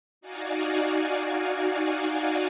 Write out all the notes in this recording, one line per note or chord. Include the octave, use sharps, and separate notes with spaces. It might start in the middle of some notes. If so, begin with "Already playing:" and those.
D#4 F#4 D5 F5 G#5